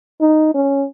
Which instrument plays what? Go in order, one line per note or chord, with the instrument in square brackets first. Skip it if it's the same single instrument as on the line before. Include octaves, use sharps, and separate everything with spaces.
[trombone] D#4
C#4